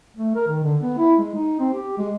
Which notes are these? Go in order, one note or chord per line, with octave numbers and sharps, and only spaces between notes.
A3
A#4
D#3
D3
B3
E4
G#3
D#4
C4
G4
G#3